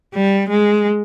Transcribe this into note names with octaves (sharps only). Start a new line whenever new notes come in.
G3
G#3